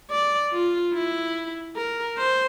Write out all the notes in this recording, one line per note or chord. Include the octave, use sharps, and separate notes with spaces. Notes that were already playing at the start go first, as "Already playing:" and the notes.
D5
F4
E4
A#4
C5